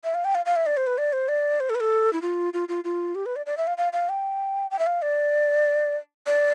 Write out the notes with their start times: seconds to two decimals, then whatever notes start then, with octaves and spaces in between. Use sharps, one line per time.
0.04 E5
0.14 F5
0.25 G5
0.35 F5
0.46 F5
0.56 E5
0.66 D5
0.77 C5
0.87 B4
0.98 D5
1.13 C5
1.28 D5
1.60 C5
1.70 A4
1.75 B4
1.80 A4
2.13 E4
2.22 F4
2.54 F4
2.69 F4
2.84 F4
3.15 G4
3.26 B4
3.36 D5
3.46 D5
3.57 E5
3.67 F5
3.78 F5
3.93 F5
4.09 G5
4.71 G5
4.79 E5
4.87 F5
5.02 D5
6.27 D5